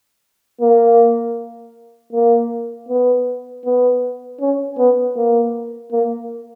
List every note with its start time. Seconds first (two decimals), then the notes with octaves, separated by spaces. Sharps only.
0.61 A#3
2.12 A#3
2.89 B3
3.65 B3
4.40 C#4
4.78 B3
5.17 A#3
5.92 A#3